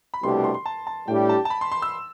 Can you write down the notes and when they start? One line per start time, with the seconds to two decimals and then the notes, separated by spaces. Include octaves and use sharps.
0.14 B5
0.23 C2 B2 A3 D4 G4 C6
0.44 C6
0.54 C6
0.66 A5
0.87 A5
1.08 A2 G3 D4 G4 G5
1.29 A5
1.45 A5
1.50 B5
1.61 C6
1.72 C6
1.82 E6